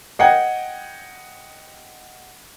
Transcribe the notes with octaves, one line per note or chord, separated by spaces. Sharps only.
D#5 F#5 G5 G#6